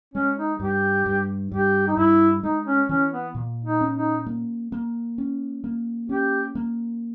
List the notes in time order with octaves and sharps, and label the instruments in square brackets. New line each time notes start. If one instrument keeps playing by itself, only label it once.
[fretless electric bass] G#3 [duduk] C#4
[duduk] D#4
[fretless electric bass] G2 [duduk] G4
[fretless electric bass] G2
[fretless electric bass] G2 [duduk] G4
[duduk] D#4
[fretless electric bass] G2 [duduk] E4
[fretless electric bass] G#3 [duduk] D#4
[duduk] C#4
[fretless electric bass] E3 [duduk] C#4
[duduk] B3
[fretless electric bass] A#2
[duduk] D#4
[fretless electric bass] C#4
[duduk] D#4
[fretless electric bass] A#3
A#3
C#4
A#3
[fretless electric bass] C#4 [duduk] G4
[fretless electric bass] A#3